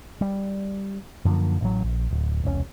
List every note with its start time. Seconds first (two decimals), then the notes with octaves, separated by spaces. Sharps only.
0.21 G3
1.25 F#2 D3 F3 A#3
1.61 A1 F#3
1.83 A#1
2.11 D1
2.43 E1 C2 C#4